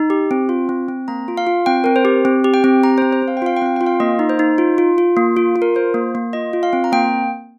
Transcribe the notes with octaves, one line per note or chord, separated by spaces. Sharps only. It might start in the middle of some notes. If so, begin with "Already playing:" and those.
Already playing: D#4
G4
C4
F4
C4
C4
A#3 A#5
F4
F5
F4
C4 G5
C4 A#4
C5
G4
C4
G4
G5
C4
G4 A#5
C5
C4
C5
C4
F5
G5
F4 F5
G5
C4 F5
F4 G5
F5
A#3 D#5
D#4
C5
D#4
F4
F4
F4
A#3
F4
F4
A#4
F4 C5
A#3
A#3
F4 D#5
F4
F5
C4
A#5
A#3 G5